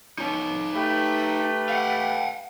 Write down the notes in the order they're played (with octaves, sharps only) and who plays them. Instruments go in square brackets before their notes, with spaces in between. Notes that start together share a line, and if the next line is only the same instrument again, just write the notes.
[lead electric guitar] D#4 C#5
[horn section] A3 G4 B4
[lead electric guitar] F5 F#5